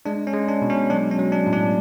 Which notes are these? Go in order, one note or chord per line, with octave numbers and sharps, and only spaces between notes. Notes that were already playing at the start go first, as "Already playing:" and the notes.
G#3 D4
C#4
G#3
D4
B2
C#4
F#3 D4
C#4
F#3
D4
A2
D4